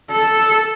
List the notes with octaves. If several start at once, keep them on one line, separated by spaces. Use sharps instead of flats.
A4